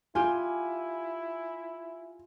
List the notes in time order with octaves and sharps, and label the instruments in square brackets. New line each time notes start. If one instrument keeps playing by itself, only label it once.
[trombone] E4 [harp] F4 G4 [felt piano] G#5